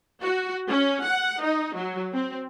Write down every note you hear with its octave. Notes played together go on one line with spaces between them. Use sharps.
F#4
C#4
F#5
D#4
F#3
C4